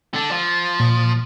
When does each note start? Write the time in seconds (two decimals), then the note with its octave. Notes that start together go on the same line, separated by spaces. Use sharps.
0.14 D3 D4
0.31 F3
0.80 A#2